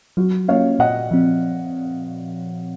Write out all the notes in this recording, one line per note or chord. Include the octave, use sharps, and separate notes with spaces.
F#3 F#4
A#3 C#4 C#5 F5
A#2 D#5 F#5
F3 C4